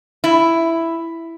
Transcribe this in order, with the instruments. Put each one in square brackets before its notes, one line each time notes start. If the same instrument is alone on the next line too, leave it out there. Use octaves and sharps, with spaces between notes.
[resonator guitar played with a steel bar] E4